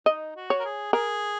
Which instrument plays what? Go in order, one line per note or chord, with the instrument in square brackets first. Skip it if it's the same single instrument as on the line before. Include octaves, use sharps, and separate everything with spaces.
[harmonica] D#4 [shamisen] D#5
[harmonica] F#4
[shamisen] C#5
[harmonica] A#4
G#4
[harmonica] G#4 [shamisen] A#4